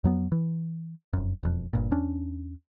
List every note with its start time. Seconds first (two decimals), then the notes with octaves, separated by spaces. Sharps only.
0.04 F2 F#3 B3
0.32 E3
1.13 F1 F#2
1.43 E1 F2
1.73 G1 G2 A#2
1.91 E2 C#4 D4